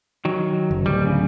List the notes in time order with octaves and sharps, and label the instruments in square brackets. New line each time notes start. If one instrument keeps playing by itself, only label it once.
[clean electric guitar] D#3 F#3
[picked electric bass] F#1
[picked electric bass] D1 [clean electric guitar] G3
[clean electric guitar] C#3